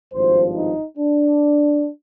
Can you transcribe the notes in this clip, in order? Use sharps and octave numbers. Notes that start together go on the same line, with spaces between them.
G#1 G2 F3 C5
D#4
D4